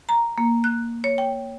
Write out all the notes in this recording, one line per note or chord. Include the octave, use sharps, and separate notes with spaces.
A#5
A#3
F#6
C#5
G5